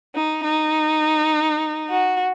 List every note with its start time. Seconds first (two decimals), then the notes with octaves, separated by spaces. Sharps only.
0.15 D#4
0.44 D#4
1.90 F#4